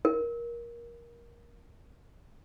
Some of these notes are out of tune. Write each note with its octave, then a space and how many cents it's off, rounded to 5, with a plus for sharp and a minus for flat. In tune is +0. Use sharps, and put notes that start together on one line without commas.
A#4 +20